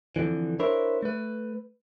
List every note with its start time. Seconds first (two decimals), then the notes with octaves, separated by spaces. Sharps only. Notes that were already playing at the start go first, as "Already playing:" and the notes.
0.16 F2 B2 D3 E3
0.60 D4 E4 A#4 C5 C#5
1.03 A3 B4